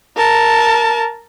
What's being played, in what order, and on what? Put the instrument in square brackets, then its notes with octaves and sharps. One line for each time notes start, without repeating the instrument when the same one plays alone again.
[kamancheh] A#4 A5